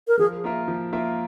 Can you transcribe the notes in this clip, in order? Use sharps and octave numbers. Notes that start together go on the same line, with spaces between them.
A#4
F3 G#4
A#3 F4 A#4 E5
F3
A#3 F4 A#4 E5